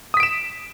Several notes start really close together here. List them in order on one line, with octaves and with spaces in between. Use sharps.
D#6 B6 D7 E7